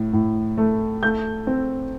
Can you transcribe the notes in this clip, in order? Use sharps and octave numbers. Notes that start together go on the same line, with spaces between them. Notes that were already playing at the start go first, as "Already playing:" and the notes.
Already playing: A2
A2
A3
A3 G6
C4